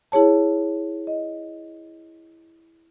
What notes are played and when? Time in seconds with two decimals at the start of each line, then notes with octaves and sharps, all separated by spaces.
0.12 E4 G#4 C#5 A5
1.07 D#5